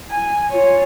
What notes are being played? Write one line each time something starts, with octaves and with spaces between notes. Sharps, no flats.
G#5
F4 C#5